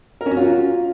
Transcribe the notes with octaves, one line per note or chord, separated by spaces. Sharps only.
A#4
C#4
F#4
F4